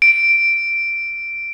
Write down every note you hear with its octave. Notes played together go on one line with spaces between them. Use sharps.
D7